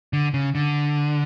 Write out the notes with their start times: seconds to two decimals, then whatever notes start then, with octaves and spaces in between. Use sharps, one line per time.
0.13 D3
0.34 C#3
0.55 D3